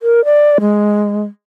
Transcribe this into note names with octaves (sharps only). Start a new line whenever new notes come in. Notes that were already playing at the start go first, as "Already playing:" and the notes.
A#4
D5
G#3